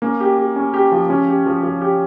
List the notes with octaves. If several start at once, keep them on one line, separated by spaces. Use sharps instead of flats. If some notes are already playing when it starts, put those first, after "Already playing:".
A#3 C#4
G4
G4
C#4
G4
F3
F3 C#4
G4
F3
F3
G4